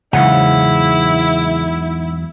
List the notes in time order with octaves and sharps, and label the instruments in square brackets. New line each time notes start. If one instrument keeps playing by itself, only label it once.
[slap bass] E2 F#3 [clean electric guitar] G#2 F#5 [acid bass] C#3 [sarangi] E4